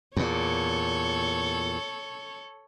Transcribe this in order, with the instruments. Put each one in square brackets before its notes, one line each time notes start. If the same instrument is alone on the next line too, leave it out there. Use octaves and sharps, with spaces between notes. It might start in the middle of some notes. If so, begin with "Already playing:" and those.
[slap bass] E2 A#2 [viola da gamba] A4 C#5